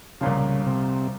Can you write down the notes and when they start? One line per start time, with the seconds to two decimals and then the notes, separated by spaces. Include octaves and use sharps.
0.21 C2 A#2 C#3 F3
0.66 C3